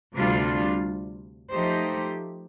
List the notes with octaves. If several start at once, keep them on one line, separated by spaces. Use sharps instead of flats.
D2 C3 G3 D4 F4
F3 A3 D#4 G4 C5